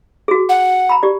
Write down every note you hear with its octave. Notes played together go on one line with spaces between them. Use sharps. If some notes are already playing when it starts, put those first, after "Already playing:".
F#4 G#4
F#5
A#5 B5
G4 D5